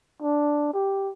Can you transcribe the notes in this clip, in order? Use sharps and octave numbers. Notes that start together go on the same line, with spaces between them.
D4
G4